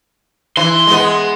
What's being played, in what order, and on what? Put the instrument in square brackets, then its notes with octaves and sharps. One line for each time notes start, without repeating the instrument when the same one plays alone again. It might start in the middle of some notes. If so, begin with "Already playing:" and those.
[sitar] E3 [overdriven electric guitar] C6
[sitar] G#3 B3